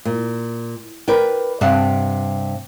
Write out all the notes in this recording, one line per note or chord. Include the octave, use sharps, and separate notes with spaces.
A#2
A#4 B4 D5 G5
G2 C3 D5 F#5 A5